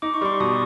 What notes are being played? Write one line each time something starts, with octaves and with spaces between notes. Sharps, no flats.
D#4 D6
C#6
G3 C6 D6
B2 C#6 D#6